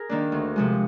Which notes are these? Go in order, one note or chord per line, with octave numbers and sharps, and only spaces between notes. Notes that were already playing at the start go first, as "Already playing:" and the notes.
Already playing: G#4 A#4
D#3 A#3 D4
D2
C3 F3 G#3